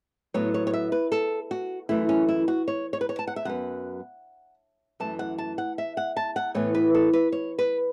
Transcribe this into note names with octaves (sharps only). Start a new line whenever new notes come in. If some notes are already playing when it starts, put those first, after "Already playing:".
A2 F#3 B3 C#5
C#5
C#5
E5
B4
A4
F#4
F#2 E3 A3 E4
C#4
E4
F#4
C#5
C#5
B4
C#5
A5
F#5
E5
F#2 F#3 B3 F#5
F#2 E3 A3 A5
F#5
A5
F#5
E5
F#5
A5
F#5
A2 E3 B3 C#5
B4
A4
B4
C#5
B4